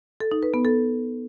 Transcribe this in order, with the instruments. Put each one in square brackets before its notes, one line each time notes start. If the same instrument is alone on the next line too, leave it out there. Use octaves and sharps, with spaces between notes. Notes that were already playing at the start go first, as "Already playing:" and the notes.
[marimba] A4
D#4
B4
B3
A4